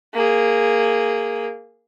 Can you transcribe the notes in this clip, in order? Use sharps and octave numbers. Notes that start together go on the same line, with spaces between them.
A#3 G#4